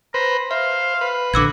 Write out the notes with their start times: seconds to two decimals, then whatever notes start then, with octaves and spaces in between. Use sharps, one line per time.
0.14 B4 C5 A#5
0.51 C5 E5 F5
1.01 B4
1.34 A#1 D3 F#4 D6 E6 G#6